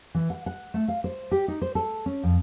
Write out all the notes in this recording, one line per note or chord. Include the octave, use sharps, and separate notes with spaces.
E3
F#5
F#5
A3
F5
C5
G4
D#4
C5
A4
C#4
F2